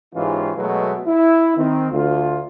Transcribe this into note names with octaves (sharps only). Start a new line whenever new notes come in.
G#2 E3 C#4 D#4 F4 G4
B2 F#3 G#3 A3 B3
E4
D#3 C4
D2 F4